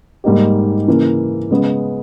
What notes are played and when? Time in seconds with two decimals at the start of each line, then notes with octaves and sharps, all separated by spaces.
0.24 G#2 G3 A#3 D#4 G4
0.87 C#3 E3 A#3
1.51 C#3 G#3 B3